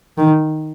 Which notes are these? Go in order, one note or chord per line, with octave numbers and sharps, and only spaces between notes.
D#3